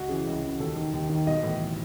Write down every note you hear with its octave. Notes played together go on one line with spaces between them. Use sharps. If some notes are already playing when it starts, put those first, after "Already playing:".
Already playing: C#2 F#4
C#3 E3 G#4
C#2
C#3 E3
D#2 A4
D#3
D#2
D#3
B1 D#5
A2 E3